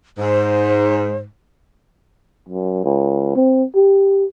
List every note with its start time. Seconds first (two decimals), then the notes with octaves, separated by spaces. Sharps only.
0.18 G#2 C5
2.49 F#2
2.84 C#2
3.36 C4
3.75 G4